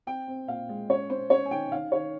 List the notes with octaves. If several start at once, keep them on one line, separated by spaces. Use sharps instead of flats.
C4 G5
C4
A#2 F5
G#3
C#4 C#5
C#4 C5
C#4 C#5
G#5
D#3 G5
D#3 F5
D#3 C#5